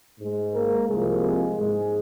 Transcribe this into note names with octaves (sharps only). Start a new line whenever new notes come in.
G#2 G#3
A#3 A#4
C2 C3 F3 G#3 A#3 G#4
G#2 G#3